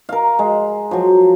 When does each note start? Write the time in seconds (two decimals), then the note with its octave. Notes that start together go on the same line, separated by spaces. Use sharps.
0.09 A#4 F5
0.39 G#3
0.91 F3 F#3